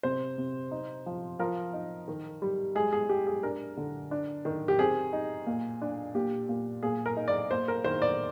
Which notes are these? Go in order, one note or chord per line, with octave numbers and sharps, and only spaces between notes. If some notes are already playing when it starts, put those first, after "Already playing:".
C3 C5
C3
D#4
F3
F3 A#4
D#4
D#3
G3
G#3 G#4
G#4
G#3 G4
G#4
D4 A#4
D3
D4
D#3
G4
C4 G#4
D#4
A#2
D4
A#2 G4
A#2
A#2 G#4
A#4
D#4
D5
A#3 C5
A#4
D#3 C5
D5